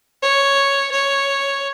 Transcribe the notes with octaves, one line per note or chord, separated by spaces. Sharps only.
C#5
C#5